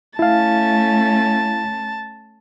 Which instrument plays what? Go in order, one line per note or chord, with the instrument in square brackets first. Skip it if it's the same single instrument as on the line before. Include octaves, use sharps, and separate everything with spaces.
[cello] A3 C#4 [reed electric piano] E4 F5 [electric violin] A5